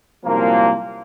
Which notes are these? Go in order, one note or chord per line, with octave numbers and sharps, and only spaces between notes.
C2 F#2 A#2 F3 A#3